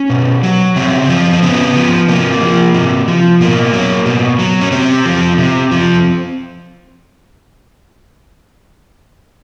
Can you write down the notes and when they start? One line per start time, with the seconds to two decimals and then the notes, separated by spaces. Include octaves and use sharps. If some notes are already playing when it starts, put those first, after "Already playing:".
Already playing: C#4
0.10 B2
0.43 F#3
0.76 C#3 C4
1.09 F3
1.33 C4
1.43 C#3 B3
1.76 F3
2.08 C3 A#3
2.41 F3
2.74 C3
3.08 F3
3.40 B2 A#3
3.73 F#3
4.06 B2
4.39 F#3
4.61 C#4
4.72 C3 C4
5.06 F3
5.38 C3
5.71 F3